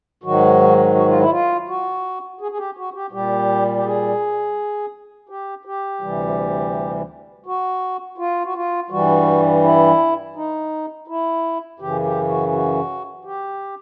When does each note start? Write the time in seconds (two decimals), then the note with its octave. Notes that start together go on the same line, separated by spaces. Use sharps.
0.23 G#2 D#3 F#3 F#4
0.95 F#4
1.07 F4
1.19 E4
1.31 F4
1.68 F#4
2.41 G#4
2.52 G#4
2.58 G4
2.77 F#4
2.94 G4
3.12 A#2 G3 G4
3.77 G4
3.85 G#4
5.29 G4
5.65 G4
6.01 D2 C3 E3 G3
7.46 F#4
8.18 F4
8.45 F#4
8.55 F4
8.90 G2 E3 G3 F#4
9.63 E4
10.35 D#4
11.08 E4
11.79 F#2 C#3 E3 G4
12.03 G4
12.28 F#4
12.52 F#4
13.24 G4